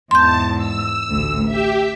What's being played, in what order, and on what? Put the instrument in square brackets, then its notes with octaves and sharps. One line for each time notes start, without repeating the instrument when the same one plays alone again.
[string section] E2 G#2 [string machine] A5 [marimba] C6 G6
[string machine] E6
[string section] A1 D2
[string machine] G4 [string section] E5